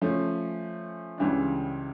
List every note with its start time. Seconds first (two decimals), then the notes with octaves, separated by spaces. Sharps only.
0.02 F3 A3 C#4
1.18 C#2 C#3 E3 G3 D4